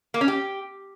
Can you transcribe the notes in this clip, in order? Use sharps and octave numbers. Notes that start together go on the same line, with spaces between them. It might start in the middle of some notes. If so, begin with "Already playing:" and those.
A#3
C#4
G4